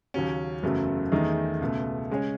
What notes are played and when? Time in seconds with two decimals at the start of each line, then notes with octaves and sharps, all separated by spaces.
0.14 D#2 C#3 F#3 C#4
0.63 F#1 E2 C#3 F#3 A3
1.12 E2 D#3 A3 D#4 G#4
1.61 C#2 B2 A3
2.10 C#3 G#3 C#4 G#4 C#5